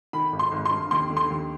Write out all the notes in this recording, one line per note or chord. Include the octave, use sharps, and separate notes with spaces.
D#3 B5
G#1
C6
G#1
C6
G2
D#2 C6
D3
C6
D#2